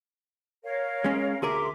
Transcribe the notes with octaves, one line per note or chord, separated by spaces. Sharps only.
A#4 C#5 F5
G#3 C#4
D2 G#4 A#4 E5 C6 D6